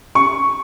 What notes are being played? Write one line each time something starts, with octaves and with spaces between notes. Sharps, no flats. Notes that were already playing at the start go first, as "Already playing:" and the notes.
C#6